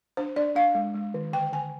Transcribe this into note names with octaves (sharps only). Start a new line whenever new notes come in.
D4 C5
D4 D5
D4 F5
G#3
G#3
D#3
D3 G5
D3 G#5